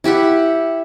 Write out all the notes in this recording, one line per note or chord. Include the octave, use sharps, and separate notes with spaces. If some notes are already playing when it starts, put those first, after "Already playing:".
E4 G4 E5 F#5